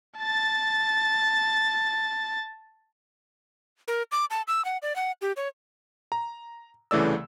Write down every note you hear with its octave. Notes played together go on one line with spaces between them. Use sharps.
A5 A6
A#4
D6
A5
E6
F#5
D5
F#5
G4
C#5
A#5
C2 C#3 E3 A3 D5 E6